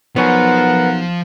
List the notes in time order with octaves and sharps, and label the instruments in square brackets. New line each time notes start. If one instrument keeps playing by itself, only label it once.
[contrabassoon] B1 [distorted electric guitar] F3 [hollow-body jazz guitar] B3 C#5 G#5 [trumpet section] A#4 F#5